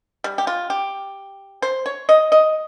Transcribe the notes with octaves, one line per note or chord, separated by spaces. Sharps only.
G3
G4
F4
G4
C5
C#5
D#5
D#5